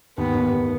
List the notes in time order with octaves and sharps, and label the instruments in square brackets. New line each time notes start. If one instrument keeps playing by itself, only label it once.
[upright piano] D#2 [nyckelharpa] B3
[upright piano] D#2
D#2